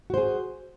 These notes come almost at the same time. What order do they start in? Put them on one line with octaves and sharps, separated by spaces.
F#4 C5 G#4